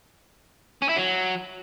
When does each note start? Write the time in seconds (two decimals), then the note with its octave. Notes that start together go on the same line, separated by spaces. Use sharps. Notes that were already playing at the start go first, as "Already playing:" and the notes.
0.82 C#4
0.89 E4
0.96 F#3